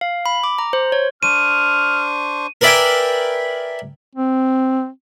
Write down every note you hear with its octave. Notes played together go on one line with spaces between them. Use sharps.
F5
B5
D6
A#5
C5
C#5
D4 C5 C#6 F6 D#7
A#4 B4 D5 E5 G5 G#5
C4